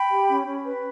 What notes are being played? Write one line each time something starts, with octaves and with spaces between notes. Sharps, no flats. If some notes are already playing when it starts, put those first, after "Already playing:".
Already playing: G5 B5
G4
C#4
C#4
B4